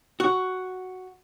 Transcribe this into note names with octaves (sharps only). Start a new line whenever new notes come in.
F#4